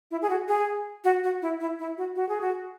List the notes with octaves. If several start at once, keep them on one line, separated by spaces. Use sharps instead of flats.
E4
G#4
F#4
G#4
F#4
F#4
E4
E4
E4
F#4
F#4
G#4
F#4